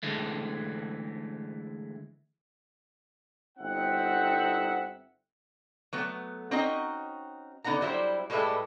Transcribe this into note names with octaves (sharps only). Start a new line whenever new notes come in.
D3 E3 G#3 A3
G1 C4 D#4 E5 F#5
F#3 A3 B3
C4 C#4 D#4 F#4 D#5 A#5
D3 B3 D#4 F#5 A#5
F#3 G3 E4 C5
A2 G3 G#3 A4 B4 E5